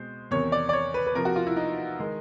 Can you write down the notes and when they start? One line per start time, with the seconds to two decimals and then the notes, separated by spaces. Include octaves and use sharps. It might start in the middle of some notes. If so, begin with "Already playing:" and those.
Already playing: B2 G#3 C4 C5
0.31 E2 C3 D#3 C#5
0.52 D5
0.69 D5
0.73 C#5
0.94 B4
1.07 B4
1.15 C3 F3 A#3 A#4
1.25 F#4
1.36 F4
1.47 E4
1.56 D#4
1.99 D#3 G#3